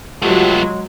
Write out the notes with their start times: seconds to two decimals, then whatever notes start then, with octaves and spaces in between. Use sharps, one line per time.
0.22 F#3 G#3 A3 B3 F4 G4